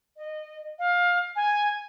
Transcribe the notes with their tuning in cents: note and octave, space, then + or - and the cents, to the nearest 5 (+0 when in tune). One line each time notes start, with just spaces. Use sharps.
D#5 -20
F5 +20
G#5 -5